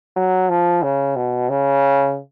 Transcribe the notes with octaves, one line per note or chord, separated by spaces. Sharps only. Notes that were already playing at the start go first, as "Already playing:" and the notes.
F#3
F3
C#3
B2
C#3